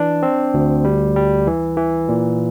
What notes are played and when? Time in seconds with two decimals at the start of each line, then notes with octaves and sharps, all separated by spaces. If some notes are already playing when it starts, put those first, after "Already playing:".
Already playing: E3 D4
0.23 C4
0.54 D2
0.84 G3
1.16 G3
1.47 E3
1.77 E3
2.09 A#2